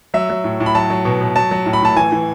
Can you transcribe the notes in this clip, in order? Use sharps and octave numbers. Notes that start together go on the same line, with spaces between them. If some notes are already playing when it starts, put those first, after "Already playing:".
F#3 E5
F#3
A2
A2
B5
F#3 A5
F#3
B2
B2
F#3 A5
F#3
A2
B5
A2 A5
E3 G#5
E3